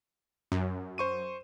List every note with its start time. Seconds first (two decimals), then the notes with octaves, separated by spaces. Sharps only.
0.52 F#2
0.98 C5 C#6 D#7